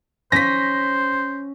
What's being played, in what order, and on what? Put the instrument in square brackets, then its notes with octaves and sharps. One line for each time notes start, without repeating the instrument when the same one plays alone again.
[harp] C#4 [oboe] C5 [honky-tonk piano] A#6 B6